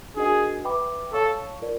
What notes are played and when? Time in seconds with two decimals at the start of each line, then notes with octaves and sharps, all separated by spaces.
0.16 D4 F#4 G#4 A#4 D#5 F#5
0.64 B4 E5 G5 B5 D6
1.13 A4 C#5 F5 A5 C#6
1.62 F4 A#4 D5